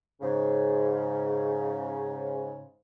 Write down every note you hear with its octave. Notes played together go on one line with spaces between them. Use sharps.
G#2 C#3